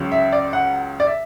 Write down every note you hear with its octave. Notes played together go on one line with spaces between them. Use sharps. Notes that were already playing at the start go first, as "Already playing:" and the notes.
Already playing: C#2 C#3 F#3
E5
D5
F#5
D5
E5